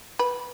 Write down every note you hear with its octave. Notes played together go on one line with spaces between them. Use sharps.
B4